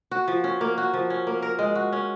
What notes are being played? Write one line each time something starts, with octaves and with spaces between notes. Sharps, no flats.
F#4
F3
C#4
A#3
F#4
F3
C#4
A#3
A#4
G#3
F#4
C#4